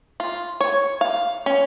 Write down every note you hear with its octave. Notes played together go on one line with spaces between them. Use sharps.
F4
C#5
F5
C#4